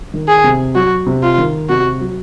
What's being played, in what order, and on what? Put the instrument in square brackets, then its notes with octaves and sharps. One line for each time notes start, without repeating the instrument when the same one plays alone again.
[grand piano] D#3
[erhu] G#4
[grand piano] C3
[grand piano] F#3 [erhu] F#4
[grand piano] C3
[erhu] F4
[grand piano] D#3
[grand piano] C3 [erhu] F#4
[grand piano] F#3